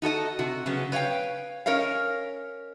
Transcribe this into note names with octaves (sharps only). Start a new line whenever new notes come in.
D#4 F#4 A4 D#5
C3 F#4
C#3 F#3 B3 C#4
B4 C#5 D#5 F5 G5
C#4 A#4 C#5 D#5 F5